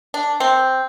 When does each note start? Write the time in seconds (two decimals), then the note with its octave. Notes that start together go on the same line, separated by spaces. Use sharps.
0.14 D4
0.40 C4